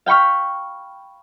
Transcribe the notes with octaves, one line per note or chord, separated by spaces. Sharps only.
F5 G5 B5 C#6 F6